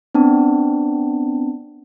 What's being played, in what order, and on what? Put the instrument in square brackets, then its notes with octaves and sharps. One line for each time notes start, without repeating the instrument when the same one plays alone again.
[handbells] B3 C4 D4